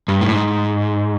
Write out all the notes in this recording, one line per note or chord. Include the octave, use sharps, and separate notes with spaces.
G2
A2
G#2